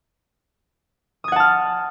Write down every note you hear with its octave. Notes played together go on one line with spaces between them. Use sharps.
F#5 A5 D#6 F6 G#6